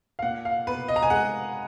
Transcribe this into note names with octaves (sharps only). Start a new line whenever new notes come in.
F5
A#2 F#5
F5
B3 B4
D#5
A#5
G#5
G#3 F#5